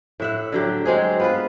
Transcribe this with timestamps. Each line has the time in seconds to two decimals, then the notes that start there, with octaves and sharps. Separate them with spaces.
0.20 A2 E5 F#5
0.52 D3 F#3 G4
0.86 F#3 G#3 C4 G#4
1.20 B3 F4 B4